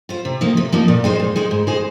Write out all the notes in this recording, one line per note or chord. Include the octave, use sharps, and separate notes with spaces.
F4 C5
C3
F3 A#3 D#4
C3
F3 A#3 D#4
A#2
G#3 D#4 C5
A#2
G#3 D#4 C5
G#2
G#3 D#4 G#4 C5